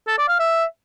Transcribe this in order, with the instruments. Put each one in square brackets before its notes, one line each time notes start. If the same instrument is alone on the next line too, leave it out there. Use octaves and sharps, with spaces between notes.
[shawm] A4
D5
F5
E5